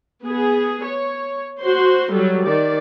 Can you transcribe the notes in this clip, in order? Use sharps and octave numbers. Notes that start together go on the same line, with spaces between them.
B3 G#4
C#5
F#4 C5 C6
F#3 G3 A4
D#3 D5